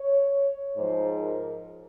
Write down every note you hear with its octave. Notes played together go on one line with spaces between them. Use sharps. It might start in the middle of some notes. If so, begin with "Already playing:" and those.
Already playing: C#5
G#2 F3 G#3 C5
A#4